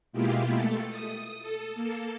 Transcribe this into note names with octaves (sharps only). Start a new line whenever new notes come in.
B2 G#3 A#3 E4 F4 G4
A3 A4
D#6
A4
A#3 A4